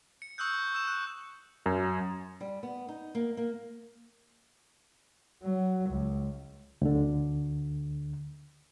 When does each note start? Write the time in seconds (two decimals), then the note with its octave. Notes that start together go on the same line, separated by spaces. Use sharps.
0.22 C#7
0.38 C#6 D#6 E6 F#6 G6
0.53 C#6
0.74 E6 E7
0.87 F#6
1.66 F#2
2.41 G3
2.63 B3
2.89 D#4
3.15 A#3
3.37 A#3
5.43 F#3
5.90 C#2
6.82 D2 D3